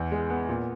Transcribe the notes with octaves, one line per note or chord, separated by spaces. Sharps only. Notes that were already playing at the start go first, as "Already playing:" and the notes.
Already playing: E2 B3
G#3
B3
A#2